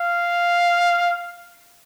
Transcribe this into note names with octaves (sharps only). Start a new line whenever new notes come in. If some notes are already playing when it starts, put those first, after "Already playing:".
Already playing: F5